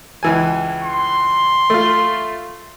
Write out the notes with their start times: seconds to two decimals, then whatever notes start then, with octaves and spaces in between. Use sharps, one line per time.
0.23 C#2 E3 G#5
0.83 C6
1.70 A3 F4